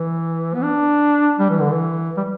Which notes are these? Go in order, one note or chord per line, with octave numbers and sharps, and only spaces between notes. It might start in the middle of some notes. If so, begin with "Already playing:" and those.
Already playing: E3
B3
D4
G3
E3
D3
E3
G3